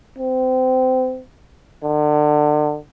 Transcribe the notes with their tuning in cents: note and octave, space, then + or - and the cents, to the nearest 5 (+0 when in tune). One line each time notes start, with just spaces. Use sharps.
C4 -25
D3 +30